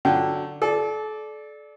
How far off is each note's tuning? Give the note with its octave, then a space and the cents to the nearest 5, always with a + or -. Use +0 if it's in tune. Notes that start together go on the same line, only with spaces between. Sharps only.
D3 +0 F#3 +0 G5 -25
A4 -35 D5 +0